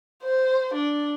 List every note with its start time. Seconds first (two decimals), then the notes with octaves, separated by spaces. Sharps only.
0.23 C5
0.74 D4